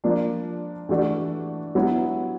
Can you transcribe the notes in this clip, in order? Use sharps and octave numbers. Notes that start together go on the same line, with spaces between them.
F3 A#3 D4 F4
E3 A3 D4 F#4
F#3 B3 E4